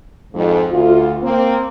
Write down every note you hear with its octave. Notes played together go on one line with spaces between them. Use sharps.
F2 G#2
D2 F4
A#3 C4